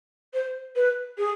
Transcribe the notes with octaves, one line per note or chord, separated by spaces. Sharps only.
C5
B4
G#4